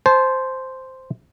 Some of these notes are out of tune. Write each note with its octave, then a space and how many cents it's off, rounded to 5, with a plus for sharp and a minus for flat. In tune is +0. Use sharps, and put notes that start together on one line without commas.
C5 -5 A5 -35